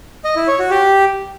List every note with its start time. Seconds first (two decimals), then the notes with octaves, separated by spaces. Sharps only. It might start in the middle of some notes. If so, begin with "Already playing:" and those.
0.25 D#5
0.36 E4
0.48 C#5
0.59 F#4
0.71 G4